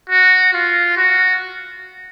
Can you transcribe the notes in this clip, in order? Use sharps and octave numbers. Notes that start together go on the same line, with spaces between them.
F#4
F4
F#4